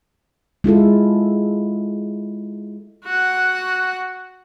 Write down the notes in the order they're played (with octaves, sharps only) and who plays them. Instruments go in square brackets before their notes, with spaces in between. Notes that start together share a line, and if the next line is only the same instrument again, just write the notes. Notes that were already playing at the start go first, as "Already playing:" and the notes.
[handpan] G#3 E4 F4 A4
[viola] F#4 F#5